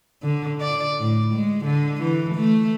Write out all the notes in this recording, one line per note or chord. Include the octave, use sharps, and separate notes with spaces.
D3
D5
A2
G#3
D3
E3
A3